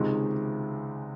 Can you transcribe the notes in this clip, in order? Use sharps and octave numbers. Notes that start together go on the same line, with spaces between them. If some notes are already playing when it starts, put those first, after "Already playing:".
Already playing: C#2 C3 D#3 G#3